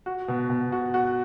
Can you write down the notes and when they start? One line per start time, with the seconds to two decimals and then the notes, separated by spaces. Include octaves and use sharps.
0.06 F#4
0.28 B2
0.50 B2
0.72 F#4
0.94 F#4